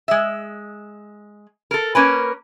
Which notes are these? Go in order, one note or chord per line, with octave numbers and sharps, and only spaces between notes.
G#3 E5
A4 A#4
A#3 C#4 A#4 B4